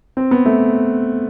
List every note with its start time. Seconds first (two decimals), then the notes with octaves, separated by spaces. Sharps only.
0.17 C4
0.31 B3
0.46 A3